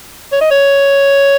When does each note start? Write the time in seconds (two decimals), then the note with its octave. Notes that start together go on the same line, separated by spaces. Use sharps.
0.32 C#5
0.41 D#5
0.51 C#5